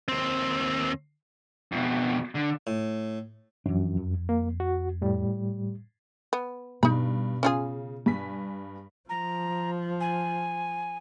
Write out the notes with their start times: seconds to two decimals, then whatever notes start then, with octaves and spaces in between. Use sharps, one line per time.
0.08 D#2 C4
1.72 F2 B2
2.35 D3
2.67 A2
3.66 F#2 E3 F3 D4
3.97 F2
4.29 A#3
4.60 F#4
5.01 A2 G3
6.33 B3
6.83 G2 B2 D#4 B5
7.43 C#3 C#4 F4 G#4
8.06 G2 G#5 B6
9.09 F3 A#5
10.00 G#5